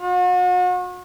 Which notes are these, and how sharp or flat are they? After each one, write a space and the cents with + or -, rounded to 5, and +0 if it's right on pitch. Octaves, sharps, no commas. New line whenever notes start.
F#4 -40